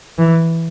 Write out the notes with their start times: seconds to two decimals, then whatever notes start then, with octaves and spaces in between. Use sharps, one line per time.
0.18 E3